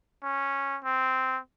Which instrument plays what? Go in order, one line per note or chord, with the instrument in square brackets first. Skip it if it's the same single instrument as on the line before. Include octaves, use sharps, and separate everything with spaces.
[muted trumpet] C#4
C4